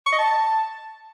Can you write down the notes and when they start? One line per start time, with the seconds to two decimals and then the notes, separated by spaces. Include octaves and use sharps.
0.06 C#6
0.12 D#5
0.18 A5